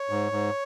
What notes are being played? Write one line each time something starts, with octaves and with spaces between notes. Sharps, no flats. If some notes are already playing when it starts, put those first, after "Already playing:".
Already playing: C#5
G#2
G#2